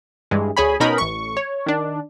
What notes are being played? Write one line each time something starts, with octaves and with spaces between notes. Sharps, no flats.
G2 E3 G#3
D2 G#4 C#5 G#5 B5
B2 C#4 D#4 A#4 B5 D#6
A1 C#6
C#5
D#3 D4